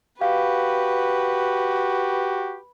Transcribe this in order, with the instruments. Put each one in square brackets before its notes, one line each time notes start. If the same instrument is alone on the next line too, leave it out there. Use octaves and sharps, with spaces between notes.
[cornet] F#4 [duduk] G4 [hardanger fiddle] B4 [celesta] F5